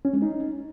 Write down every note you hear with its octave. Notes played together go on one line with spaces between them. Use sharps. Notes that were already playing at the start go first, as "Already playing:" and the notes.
C#4
G#3
D#4